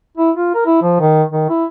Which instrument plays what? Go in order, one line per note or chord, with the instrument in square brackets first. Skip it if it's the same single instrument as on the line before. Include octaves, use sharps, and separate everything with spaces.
[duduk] E4
F4
A#4
E4
F3
D#3
D#3
E4